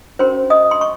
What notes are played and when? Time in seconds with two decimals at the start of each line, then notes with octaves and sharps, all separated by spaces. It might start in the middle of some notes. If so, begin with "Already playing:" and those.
0.19 C#4 F#4 A#4 C5 C6
0.50 D#5 D#6
0.71 C6
0.81 C#6